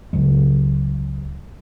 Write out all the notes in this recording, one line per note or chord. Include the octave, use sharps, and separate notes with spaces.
C#2 C#3 F#3 G#3